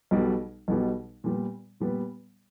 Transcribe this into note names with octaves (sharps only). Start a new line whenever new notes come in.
B1 B2 G3
B1 B2 G3
A#2 G3 B3
A#2 G3 B3